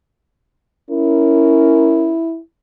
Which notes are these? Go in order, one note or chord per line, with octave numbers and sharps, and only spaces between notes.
C#4 E4 A#4